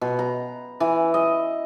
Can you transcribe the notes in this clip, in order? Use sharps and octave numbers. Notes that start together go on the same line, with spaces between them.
B2
A#5
E3
D#5